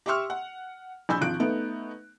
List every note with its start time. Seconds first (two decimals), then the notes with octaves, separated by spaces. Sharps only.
0.06 G4 E5 C6 C#6 E6 F6
0.30 F#5
1.09 A#1 G#5 B5 E6 G6
1.21 G#1 F3 F#6 D7
1.40 A3 B3 D#4